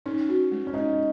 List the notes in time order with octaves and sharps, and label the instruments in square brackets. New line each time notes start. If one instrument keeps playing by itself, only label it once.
[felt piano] C#4 [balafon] D#4
[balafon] F#4
G#3
[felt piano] C#4
[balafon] G#3 [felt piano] D#4